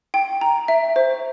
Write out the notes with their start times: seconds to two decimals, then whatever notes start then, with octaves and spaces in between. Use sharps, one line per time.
0.14 G5
0.41 A#5
0.68 E5
0.96 C5